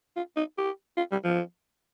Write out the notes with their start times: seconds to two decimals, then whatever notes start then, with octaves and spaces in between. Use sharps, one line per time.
0.16 F4
0.37 D#4
0.58 G4
0.97 F4
1.12 G3
1.24 F3